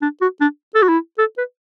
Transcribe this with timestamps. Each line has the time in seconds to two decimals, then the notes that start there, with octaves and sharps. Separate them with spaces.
0.02 D4
0.21 F#4
0.41 D4
0.75 A4
0.82 F#4
0.89 E4
1.18 A4
1.38 B4